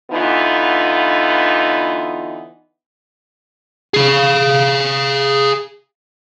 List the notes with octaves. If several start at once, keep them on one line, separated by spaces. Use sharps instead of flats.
D3 E3 B3 D#4 F4
G#4 F5